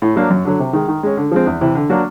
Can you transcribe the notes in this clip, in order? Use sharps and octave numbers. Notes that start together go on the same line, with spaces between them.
A2
F#3 A#3 D4
F#2
D3 F#3
C3
D#3 G#3
D#3
G#3 C#4
D3
F3 G#3 C4
E2
C3 E3
D3
F#3 A#3 D4 F#4